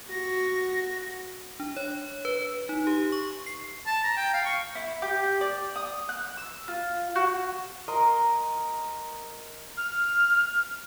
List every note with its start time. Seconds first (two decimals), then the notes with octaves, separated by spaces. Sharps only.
0.10 F#4 A#6
1.60 D4
1.77 C#5
2.25 B4
2.69 D#4
2.87 G4
3.12 C#6
3.46 C7
3.86 A5
4.04 A#5
4.17 G5
4.34 F5
4.45 C#6
4.75 E4
5.02 G4
5.41 D5
5.76 D#6
6.09 F#6
6.37 E6
6.68 F4
7.16 F#4
7.88 A#4 D#5 A#5 C6
9.77 F6